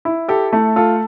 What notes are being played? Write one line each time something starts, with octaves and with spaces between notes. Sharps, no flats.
E4
G4 A4
A3 E4
F4 A4